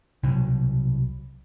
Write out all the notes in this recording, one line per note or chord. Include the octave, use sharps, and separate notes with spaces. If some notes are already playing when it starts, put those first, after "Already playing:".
C2 B2 F#3